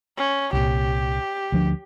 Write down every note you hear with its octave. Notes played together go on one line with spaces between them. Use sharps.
C#4
C2 A#2 G4
D2 F3 D4